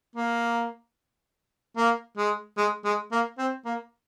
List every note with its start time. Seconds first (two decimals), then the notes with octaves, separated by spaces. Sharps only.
0.16 A#3
1.77 A#3
2.17 G#3
2.57 G#3
2.85 G#3
3.12 A#3
3.39 C4
3.66 A#3